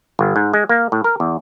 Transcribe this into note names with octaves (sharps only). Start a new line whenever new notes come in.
G1
G#2
G#3
A#3
A2
A#4
E2